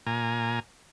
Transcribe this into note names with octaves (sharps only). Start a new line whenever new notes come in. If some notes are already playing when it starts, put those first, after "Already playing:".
A#2 G#5 A#5